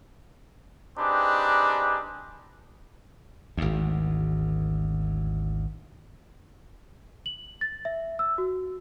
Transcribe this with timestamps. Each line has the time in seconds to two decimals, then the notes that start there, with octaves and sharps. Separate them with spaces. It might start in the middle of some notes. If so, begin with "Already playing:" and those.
0.98 C4 D4 D#4 G4 G#4 B4
3.57 G#1 D2
7.26 F#7
7.61 A6
7.85 E5
8.19 E6
8.38 F#4